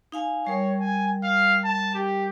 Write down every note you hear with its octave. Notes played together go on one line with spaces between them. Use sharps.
D#4 F5 G#5
G3 A#4 C#5
G#5
F5
A5
G4